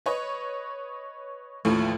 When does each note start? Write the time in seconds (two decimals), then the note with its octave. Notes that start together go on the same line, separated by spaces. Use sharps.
0.06 B4 C#5 D#5
1.65 A1 D#2 A2 F3